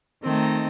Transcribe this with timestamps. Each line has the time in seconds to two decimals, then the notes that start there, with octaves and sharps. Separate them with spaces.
0.23 D#3 A3 C4 D#4 A4